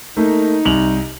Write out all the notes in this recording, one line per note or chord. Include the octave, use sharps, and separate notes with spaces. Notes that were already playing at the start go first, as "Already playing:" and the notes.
A3 A#3 D#4
C2 F7 F#7